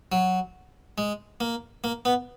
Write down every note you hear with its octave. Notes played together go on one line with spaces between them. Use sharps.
F#3
G#3
A#3
A#3
B3